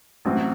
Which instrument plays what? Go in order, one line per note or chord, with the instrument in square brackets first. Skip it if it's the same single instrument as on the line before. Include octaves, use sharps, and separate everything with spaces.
[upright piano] A1 A2 F#3 C4 F#4